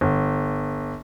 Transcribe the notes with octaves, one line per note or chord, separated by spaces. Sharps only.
G1